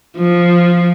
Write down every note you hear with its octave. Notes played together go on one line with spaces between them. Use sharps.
F3